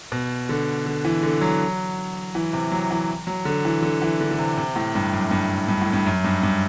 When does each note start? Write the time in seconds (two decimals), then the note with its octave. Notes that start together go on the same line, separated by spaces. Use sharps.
0.12 B2
0.49 D3
0.86 D3
1.05 E3
1.23 D3
1.41 F#3
2.35 E3
2.53 C3
2.72 F#3
2.91 E3
3.27 F#3
3.45 D3
3.65 E3
3.83 D3
4.02 E3
4.21 D3
4.31 D3
4.39 C3
4.57 C3
4.76 A2
4.95 G2
5.13 F#2
5.31 G2
5.68 G2
5.81 A2
5.93 G2
6.06 F#2
6.24 G2
6.43 G2